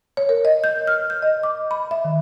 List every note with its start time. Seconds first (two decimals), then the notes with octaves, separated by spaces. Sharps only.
0.17 C#5
0.29 A#4
0.45 D#5
0.64 G6
0.87 F6
1.10 G6
1.22 D#5
1.43 D6
1.71 B5
1.91 E5
2.05 D#3